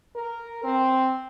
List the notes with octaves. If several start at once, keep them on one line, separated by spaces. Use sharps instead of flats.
A#4
C4